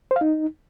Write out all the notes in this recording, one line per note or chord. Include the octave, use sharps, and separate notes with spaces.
C5
F5
D#4